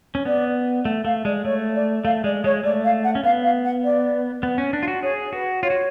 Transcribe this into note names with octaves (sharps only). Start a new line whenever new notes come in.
C#4
B3 D5
A3 F#5
A3 F5
G#3 D5
A3 C#5
D5
A3 F5
G#3 D5
G#3 C#5
A3 D5
F5
F#5
C#4
B3 F5
F5
F#5
D5
B3
C#4
D4
F4
F#4
G#4 C#5
F#4 B4
F4 C#5
F#4